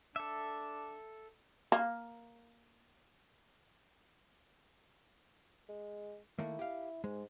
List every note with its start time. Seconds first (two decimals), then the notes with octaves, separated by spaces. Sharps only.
0.16 D4 A4 E5
1.72 A#3 F5
5.69 G#3
6.39 D#3 A3 A#3 E4
6.59 G4 F5
7.04 G#2 G#3